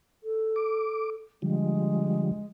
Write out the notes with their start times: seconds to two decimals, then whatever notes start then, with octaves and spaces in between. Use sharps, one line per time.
0.23 A4
0.56 D6
1.42 D3 F3 G3 G#3